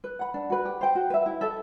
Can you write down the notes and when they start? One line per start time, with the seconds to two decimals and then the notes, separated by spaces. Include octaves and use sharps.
0.04 B4
0.19 F#5 B5
0.34 D4
0.50 F#4 B4
0.65 G4
0.81 C5 G5
0.95 F#4
1.10 B4 E5
1.26 E4
1.41 A4 E5